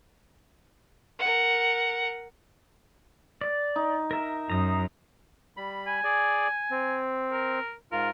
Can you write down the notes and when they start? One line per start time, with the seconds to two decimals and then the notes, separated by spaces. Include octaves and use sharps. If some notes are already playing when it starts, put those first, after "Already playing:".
1.19 A#4 F#5
3.41 D5
3.76 D#4
4.11 A#4 E5
4.50 F#2 A#5 D#6
5.57 G3 B5
5.87 G#5
6.04 G#4 D5
6.71 C4
7.32 A#4
7.92 G#2 F4 A#4